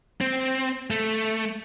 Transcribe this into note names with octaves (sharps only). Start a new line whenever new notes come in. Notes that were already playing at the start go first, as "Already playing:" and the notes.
C4
A3